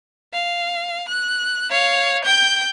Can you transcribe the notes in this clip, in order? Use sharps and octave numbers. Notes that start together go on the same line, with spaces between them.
F5
F#6
C#5 F5
G5 G6